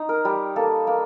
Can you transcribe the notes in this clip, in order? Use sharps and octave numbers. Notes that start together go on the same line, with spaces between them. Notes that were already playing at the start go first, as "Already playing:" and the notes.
Already playing: D#4
A#4
G3
A#3 A4
A#3